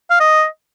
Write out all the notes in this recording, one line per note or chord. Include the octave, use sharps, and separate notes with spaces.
F5
D#5